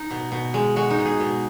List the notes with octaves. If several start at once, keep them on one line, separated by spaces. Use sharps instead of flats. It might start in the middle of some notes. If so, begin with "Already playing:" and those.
Already playing: D#4
B2
B2
G#3
G#3 F#4
D#4
B2
G#4
B2